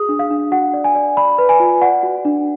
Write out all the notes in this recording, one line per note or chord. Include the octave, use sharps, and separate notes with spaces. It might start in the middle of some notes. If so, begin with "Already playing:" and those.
Already playing: F#4 G#4 D#6
D4
F5
D4
F#4 F#5
D5
G#5
D5
D5 B5
B4
G#5
F4
D5 F#5
F#4
D4